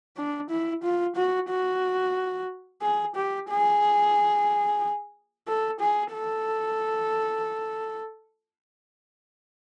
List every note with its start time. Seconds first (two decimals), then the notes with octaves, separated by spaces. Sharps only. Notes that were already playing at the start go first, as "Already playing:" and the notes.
0.17 D4
0.50 E4
0.83 F4
1.16 F#4
1.49 F#4
2.82 G#4
3.16 G4
3.49 G#4
5.47 A4
5.80 G#4
6.14 A4